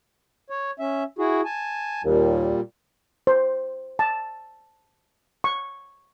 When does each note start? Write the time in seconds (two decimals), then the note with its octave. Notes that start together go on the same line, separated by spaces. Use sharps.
0.50 C#5
0.79 C#4 E5
1.19 E4 F#4 G#4
1.45 G#5 A5
2.04 D#2 A#2 G3
3.27 C5
3.99 A5
5.44 C#6